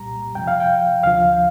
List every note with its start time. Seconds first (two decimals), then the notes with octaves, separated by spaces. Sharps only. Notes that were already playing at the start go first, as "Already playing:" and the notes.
Already playing: C2 A#2 G3 A#5
0.35 F2 C3 F3 G5
0.47 F5
0.60 G5
1.03 D2 D3 F3 F5